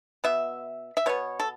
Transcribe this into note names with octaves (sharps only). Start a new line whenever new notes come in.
B2 B3 E5
E5
B2 B3 C#5
A4